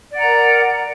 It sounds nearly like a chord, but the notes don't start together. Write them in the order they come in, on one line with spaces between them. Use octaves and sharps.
D5 F#5 A#5 A#4